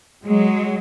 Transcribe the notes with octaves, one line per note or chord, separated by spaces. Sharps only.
F#3 G#3